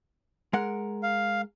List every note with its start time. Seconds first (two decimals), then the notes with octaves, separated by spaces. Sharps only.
0.53 G#3 A#4 F#5
1.03 F5